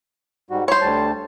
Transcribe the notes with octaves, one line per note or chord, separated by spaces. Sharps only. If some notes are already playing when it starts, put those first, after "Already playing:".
G#2 G3 F#4
C5 C#5 B5 C6
D2 G3 A5